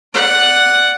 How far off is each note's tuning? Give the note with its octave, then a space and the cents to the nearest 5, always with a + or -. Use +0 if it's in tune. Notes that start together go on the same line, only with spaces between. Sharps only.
D5 +0 F#5 +0